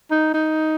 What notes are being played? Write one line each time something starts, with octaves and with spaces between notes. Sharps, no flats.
D#4
D#4